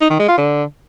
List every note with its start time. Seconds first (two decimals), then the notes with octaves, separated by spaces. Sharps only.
0.01 D#4
0.10 D#3
0.19 G#3
0.28 F4
0.37 D3